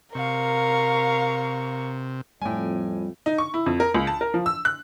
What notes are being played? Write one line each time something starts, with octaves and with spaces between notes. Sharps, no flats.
C3 A#4 F5 C#6
F2 A2 G3 G5 G#5
D#4
C#6
E4
F2
A#4
C#2
A5
A#4
F3
E6
F#6